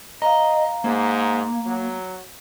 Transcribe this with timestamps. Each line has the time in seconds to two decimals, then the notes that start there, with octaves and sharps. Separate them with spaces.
0.22 D#5 F5 A#5
0.84 G#2 A#3
1.66 F#3